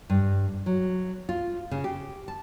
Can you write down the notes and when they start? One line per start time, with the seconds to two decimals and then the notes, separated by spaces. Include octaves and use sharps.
0.10 G2
0.66 F#3
1.29 F4
1.71 C#3
1.84 G4
2.28 A5